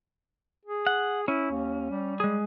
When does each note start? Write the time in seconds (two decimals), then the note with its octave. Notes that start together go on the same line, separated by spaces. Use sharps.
0.66 G#4
0.87 F#5
1.28 C#4 E4
1.51 D#2
1.90 G3
2.20 G#3 G#4